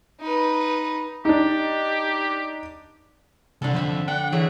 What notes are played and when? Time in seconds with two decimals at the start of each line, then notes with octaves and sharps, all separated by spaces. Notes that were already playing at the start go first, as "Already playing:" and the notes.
0.21 D#4 B4
1.25 D4 D#4 G4
3.62 C2 D3 A4
3.74 F2 C5 E5 B5
4.08 D4 F#5 G5
4.32 E3 F#3 G#4 E5